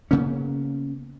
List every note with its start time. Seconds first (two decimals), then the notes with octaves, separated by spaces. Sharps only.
0.11 C#3 A#3 B3 C#4